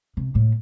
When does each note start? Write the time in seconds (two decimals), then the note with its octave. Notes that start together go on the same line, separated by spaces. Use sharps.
0.17 C3
0.35 A2